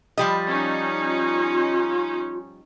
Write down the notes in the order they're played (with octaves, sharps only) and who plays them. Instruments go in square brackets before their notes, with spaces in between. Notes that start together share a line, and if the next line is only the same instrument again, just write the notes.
[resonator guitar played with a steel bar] F3 G3 D#5
[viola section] C#4 D#4
[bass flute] F4